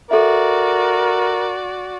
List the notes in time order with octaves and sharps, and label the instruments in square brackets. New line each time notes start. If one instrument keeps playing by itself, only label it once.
[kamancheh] F#4 D5 [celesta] A4 E5 [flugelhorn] A#4